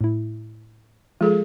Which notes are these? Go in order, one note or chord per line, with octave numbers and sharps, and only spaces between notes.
A2 E4
F3 G#3 F4 G#4 A4